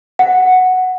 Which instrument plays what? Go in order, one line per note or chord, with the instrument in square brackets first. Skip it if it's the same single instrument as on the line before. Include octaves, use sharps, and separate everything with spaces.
[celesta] F#5